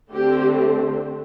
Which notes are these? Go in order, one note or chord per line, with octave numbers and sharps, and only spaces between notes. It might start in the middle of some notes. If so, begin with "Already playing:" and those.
D3 A3 C4 G4